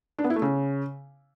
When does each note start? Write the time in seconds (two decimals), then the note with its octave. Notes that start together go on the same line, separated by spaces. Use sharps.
0.18 D4
0.24 B3
0.30 E4
0.36 A3
0.42 C#3